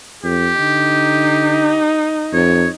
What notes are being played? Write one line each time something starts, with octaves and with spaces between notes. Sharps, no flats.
F2 G4
D3 D#4
F2 C#5